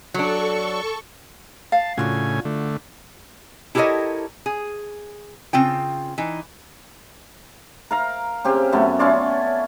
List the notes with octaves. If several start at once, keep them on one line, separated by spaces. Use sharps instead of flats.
F#3 D4 A4 C#6
F5 A5
A2 C#3 D4 F4 F#4 G#5
D3 A3
E4 G4 A4 A#4 C#5 D#5
G#4
C#3 C4 F4 G5
E3 D#4
A#4 F5 A#5
C#3 C4 G4
F#2 A3 B3
C#4 E4 F4 D5